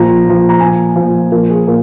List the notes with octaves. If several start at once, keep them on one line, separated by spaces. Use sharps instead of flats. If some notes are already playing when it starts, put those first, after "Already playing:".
Already playing: A#2 F3 A#5
A#2 F3
A#5
A#2 F3 G#5
A#2 F3
A#2 F3 A#4
G#4
A#2 A#4